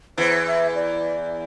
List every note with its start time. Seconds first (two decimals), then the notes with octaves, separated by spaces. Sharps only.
0.17 E2 E3 C5
0.47 E5
0.75 D5